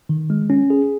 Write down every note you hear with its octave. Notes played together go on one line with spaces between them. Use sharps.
D#3
G#3
C#4
G#4